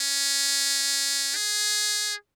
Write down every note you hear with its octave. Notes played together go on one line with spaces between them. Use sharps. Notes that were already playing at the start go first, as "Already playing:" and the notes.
Already playing: C#4
G#4